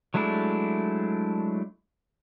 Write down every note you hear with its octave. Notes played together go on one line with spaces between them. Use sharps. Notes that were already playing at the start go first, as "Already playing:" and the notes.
F#3 G#3 A3 D4 E4